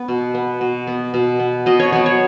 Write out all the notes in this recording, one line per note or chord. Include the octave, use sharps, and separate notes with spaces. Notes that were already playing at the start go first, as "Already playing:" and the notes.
Already playing: B3
B2
B3
B2
B3
B2
B3
B2 D#5
C#5
F#3 B3 C#5
C#5